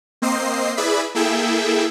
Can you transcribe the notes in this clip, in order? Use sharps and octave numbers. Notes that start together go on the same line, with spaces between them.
A#3 C4 C5 D#5 C7
E4 G#4 B4 D5 E5 B5
A#3 E4 G#4 A4 E5 G5